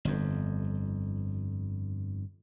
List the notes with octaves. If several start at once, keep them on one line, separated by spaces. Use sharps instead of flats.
G1 F2